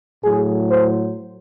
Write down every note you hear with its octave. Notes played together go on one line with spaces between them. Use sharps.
A2 F#3 G#4
C5